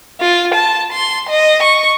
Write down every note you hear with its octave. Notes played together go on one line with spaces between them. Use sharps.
F4
A5
C6
D#5
C#6